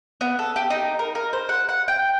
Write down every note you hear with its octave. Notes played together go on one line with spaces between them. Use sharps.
B3
A4
G4
D#4
A#4
A#4
C5
F#5
F#5
G5